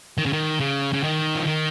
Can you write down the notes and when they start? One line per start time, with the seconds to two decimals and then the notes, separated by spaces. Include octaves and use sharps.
0.18 D#3
0.26 C#3
0.33 D#3
0.60 C#3
0.93 C#3
1.03 D#3
1.35 F3
1.47 D#3